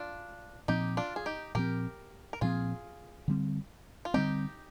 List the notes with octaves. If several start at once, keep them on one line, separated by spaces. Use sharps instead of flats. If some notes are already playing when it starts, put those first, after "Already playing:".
Already playing: D4 F4
A#2 F3 C4 D#4 G4
D4 F4
G#4
D#4 G4
A#2 F3 C4 G4 A#4
A#4
A#2 F3 C4 F4 G#4
D3 G3 C4
F4
D3 G3 C4 D#4 G4